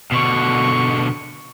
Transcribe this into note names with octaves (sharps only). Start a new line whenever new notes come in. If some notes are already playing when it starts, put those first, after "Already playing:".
B2 D3 C#6